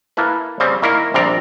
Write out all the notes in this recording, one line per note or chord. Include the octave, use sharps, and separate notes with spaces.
A#3 E4 A4 B4
C#3 G3 C4
D#3 A#3 E4 A#4
A#1 G3 C4 D5 A#5